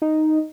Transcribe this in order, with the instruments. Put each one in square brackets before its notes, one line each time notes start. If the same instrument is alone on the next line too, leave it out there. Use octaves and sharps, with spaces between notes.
[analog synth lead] D#4